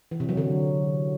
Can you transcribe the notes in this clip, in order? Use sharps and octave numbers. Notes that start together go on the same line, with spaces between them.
E3
C3
F#3
D3